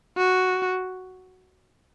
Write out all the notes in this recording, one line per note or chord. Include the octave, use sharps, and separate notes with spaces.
F#4